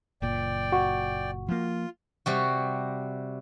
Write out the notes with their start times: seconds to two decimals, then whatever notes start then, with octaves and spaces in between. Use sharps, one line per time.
0.22 F#1 A#2 D5 G5
0.72 F#4 F#5 C#6
1.48 F3 A#3 F4
2.26 C3 G3 F#4